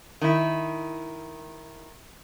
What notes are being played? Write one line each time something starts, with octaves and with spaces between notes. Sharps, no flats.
D#3 E4